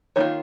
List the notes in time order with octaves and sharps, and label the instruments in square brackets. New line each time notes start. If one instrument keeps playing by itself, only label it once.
[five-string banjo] D#3 A#3 F4 C#5